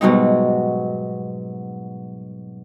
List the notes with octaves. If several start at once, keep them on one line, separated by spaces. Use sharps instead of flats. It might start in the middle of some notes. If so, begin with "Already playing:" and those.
G#2 B2 F#3 G3 D#4